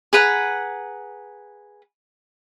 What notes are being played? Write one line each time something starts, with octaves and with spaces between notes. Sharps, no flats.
G#4 B4 F#5 A#5